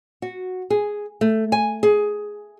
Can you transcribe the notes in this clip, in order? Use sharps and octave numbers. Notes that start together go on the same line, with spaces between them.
F#4
G#4
A3
G#5
G#4